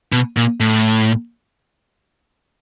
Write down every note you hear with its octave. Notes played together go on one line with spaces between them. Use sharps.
B2
A#2
A2